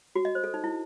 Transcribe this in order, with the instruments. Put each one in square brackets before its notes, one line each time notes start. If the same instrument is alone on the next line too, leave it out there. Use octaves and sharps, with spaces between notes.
[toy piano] F#4
D#5
C5
A4
D#4
E4